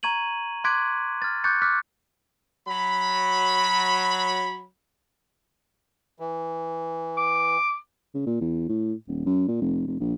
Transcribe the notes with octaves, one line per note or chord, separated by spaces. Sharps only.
A#5 C#6 G#6 D#7 F#7
C6 D6 F#6 G#6 B6 D7
F6 A6
C#6 D6 F#6 G6 A6 C#7
D6 F6 F#6 B6
F#3 B5
E3
D6
C#3
A#2
E2
A2
D#1
F#2
A#2
F1
F1
A#1